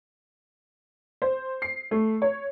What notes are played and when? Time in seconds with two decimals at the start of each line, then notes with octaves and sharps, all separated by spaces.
1.22 C5
1.62 C7
1.91 A3
2.22 C#5